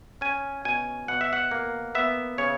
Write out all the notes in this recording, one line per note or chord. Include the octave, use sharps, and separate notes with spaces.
C#4 G#5
B2 G#5
B2 F#5
E5
F#5
A#3
B3 E5
C#3 C#5